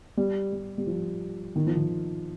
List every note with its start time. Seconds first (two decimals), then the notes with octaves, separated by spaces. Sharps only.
0.17 G3
0.53 G3
0.78 G3
0.87 F3
1.56 D#3
1.67 F3
1.77 D#3